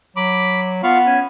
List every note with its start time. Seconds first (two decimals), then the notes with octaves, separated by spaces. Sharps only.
0.17 F#3 B5 D6
0.83 B3 F4 F5 C#6
1.06 C#4 G#5